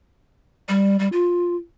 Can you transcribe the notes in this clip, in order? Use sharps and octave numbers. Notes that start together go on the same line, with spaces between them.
G3
G3
F4